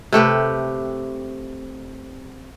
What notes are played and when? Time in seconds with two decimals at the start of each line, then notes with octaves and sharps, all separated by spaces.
0.13 C3 A3 G4 B4